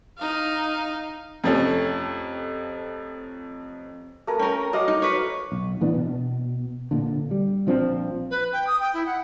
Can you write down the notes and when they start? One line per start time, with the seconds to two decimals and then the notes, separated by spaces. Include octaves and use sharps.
0.18 D#4 F5
1.44 F2 C3 F3 A3 C#4
4.27 A3 A#4 G#5
4.39 C#4 A#4 G5
4.73 F#3 D#5 F5 D6
4.88 D#4
5.02 B4 C#5
5.52 B1
5.81 A#2 E3 B3 D4
5.94 B2
6.91 A#2 D3
7.31 G3
7.67 A#1 F3 C4 D4
8.31 B4
8.53 G5
8.67 D#6
8.80 G5
8.94 E4
9.06 F#5